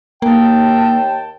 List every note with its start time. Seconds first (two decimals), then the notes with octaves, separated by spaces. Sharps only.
0.22 D#2 A#3 G5 A5